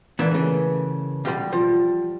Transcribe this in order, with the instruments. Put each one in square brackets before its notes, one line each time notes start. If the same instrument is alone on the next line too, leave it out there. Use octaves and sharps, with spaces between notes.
[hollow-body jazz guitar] D3 B3 [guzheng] E3 A#3 E5
[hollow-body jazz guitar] C#3 A3
[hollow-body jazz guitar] B2 F5 B5 [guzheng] G3 G4
[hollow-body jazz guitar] F3